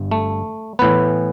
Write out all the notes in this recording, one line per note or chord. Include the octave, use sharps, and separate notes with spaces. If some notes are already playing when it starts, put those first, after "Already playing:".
Already playing: G1 G2
A3
A2 E3 B3 B4